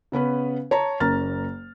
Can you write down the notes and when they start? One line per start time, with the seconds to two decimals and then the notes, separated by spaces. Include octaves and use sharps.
0.12 C#3 B3 C#4 B4
0.71 C#5 A5 A#5
1.00 F#1 A#3 C#4 A#5 F6 A6